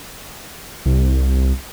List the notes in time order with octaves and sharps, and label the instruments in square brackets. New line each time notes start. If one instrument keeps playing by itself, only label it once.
[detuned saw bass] C2